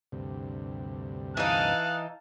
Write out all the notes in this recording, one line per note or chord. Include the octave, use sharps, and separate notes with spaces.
D2 G2 C3
E3 D#4 F5 A5 F#6